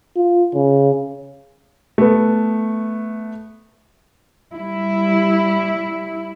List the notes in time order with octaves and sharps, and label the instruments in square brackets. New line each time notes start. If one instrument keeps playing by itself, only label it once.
[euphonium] F4
C#3
[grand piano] A3 B3
[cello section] G3 E4